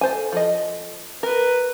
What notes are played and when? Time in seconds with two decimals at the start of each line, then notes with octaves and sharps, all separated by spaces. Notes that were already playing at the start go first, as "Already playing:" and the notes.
0.01 A4 C5 G#5
0.32 F3 A4 D#5
1.23 A#4 B4